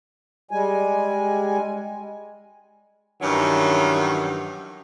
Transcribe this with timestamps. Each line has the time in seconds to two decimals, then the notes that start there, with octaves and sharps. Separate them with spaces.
0.51 G3 G#3 G#5
3.22 G2 D#3 E3 F#3 C#4